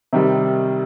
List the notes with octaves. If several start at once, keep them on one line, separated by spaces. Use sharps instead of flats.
C3 D#3 G3